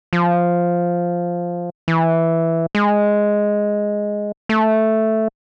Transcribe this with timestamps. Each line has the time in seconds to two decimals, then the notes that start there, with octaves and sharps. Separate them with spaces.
0.13 F3
1.88 E3
2.75 G#3
4.49 A3